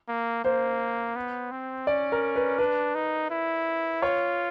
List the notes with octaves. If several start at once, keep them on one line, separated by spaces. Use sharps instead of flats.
A#3
A#3 C5
B3
C4
C#4 D5
A#4
B4
D4 B4
D#4
E4
F4 C#5